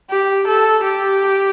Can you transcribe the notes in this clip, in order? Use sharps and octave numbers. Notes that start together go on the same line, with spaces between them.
G4
A4
G4